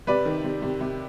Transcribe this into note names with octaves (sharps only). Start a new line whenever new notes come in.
C3 B4 D5
D#3
C3
C3
C3